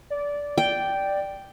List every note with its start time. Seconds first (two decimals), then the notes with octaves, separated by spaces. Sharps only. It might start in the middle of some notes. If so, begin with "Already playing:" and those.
0.10 D5
0.58 G5